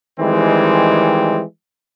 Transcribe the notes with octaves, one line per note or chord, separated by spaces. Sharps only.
D#3 E3 G3 G#3 C4